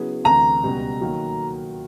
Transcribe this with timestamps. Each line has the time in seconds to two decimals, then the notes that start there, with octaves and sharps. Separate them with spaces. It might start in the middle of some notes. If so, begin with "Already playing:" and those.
Already playing: C#3 F#3 B3 E4 G#4
0.24 D2 C3 E3 A#5
0.63 C#2 B2 G3
1.01 D#3 F#3 A#3